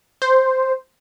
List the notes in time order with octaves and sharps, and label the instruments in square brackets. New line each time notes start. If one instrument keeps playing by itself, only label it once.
[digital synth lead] C5